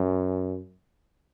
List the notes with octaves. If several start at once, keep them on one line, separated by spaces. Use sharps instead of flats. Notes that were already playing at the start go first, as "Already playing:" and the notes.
Already playing: F#2